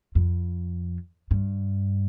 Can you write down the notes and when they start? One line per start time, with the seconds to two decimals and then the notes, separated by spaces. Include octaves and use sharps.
0.15 F2
1.31 G2